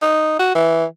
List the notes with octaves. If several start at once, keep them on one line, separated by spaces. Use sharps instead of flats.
D#4
F#4
E3